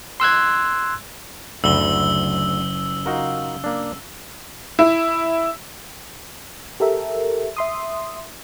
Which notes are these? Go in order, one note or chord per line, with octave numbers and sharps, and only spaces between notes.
C6 E6 F#6 G#6
F#1 D2 E6 G7
D#4 F4 F#4 A#4
A#3 D4
E4
G4 A4 A#4 E5
E5 C6 D#6